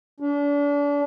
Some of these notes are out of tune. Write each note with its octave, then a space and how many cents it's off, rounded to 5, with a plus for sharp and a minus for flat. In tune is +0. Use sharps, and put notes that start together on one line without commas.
D4 -35